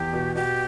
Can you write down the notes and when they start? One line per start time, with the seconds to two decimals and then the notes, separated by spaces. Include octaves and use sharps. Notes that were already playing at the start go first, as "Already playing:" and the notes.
Already playing: E2 G4
0.13 B2
0.36 B2 G4